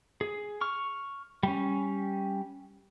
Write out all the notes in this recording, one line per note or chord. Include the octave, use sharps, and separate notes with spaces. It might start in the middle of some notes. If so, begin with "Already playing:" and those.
G#4
C#6 F6
G3 C#4